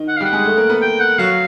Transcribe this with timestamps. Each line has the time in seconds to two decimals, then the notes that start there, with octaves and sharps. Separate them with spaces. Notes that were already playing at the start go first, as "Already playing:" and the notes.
Already playing: D#3 D#4
0.08 F#5
0.17 F5
0.20 G3 G4 F#5
0.33 G#3 G#4
0.45 A3 A4
0.57 A#3 A#4
0.70 B3 B4
0.81 G5
1.00 F#5
1.18 F#3 F#4 F5